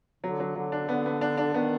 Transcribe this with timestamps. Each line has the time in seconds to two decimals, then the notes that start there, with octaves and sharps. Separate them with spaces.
0.23 D3 F#3
0.40 F#3
0.56 D3 F#3
0.72 D4
0.89 D3 B3
1.06 B3
1.21 D4
1.37 D4
1.54 D#3 B3